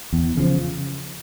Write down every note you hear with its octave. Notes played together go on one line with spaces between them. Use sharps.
E2
C#3 F3